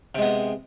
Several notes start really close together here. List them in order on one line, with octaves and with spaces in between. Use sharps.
C3 G#3 B3